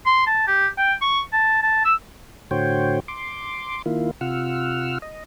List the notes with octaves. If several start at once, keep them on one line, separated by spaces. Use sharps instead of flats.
C6
A5
G4
G5
C#6
A5
A5
E6
A2 D3 F#4 C5 C#5 G5
C6 D6
D#3 A#3 E4 F4
C3 F4 F#5 E6 F6
D#5